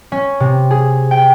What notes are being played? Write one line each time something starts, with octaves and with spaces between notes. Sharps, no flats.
C#4
C3
G#4
G5